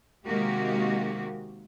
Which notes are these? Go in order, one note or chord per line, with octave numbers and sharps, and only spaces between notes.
C3 D#3 G#3 A#3 F#4 G4